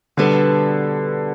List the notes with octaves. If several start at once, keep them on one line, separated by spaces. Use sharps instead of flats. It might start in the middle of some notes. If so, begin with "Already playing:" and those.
B2 D3 G3 B3 D4 A4